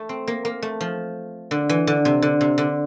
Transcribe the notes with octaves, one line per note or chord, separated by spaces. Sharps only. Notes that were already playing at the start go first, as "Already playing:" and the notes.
Already playing: A3
C4
A#3
A#3
A3
F3
D3
E3
D3
C3
D3
C3
D3